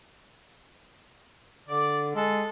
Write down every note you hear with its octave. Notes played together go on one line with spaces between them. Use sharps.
D3 D5
G#3 A4